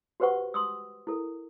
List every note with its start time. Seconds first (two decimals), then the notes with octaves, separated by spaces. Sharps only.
0.20 F#4 G4 B4 C5 F#5 C#6
0.54 C6 D#6 E6
1.07 E4 A4 A#4